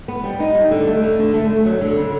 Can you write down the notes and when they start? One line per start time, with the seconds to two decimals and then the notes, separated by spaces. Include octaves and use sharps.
0.08 B3
0.24 G3
0.40 D#4
0.55 G3
0.71 D3
0.87 A3
1.03 D3
1.19 D3
1.34 A3
1.50 A3
1.65 F#3
1.81 D3
1.97 C#3